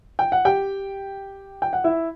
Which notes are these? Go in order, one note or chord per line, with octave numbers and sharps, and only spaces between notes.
G5
F#5
G4 G5
G5
F#5
E4 E5